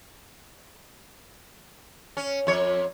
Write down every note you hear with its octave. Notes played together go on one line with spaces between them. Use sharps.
C#4
F2 C#5